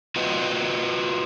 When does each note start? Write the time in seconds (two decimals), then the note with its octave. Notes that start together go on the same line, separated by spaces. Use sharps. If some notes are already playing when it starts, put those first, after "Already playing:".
0.16 F4 F#4 B4 D5 D#5